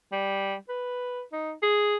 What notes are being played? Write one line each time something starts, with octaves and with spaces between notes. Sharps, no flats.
G3
B4
D#4
G#4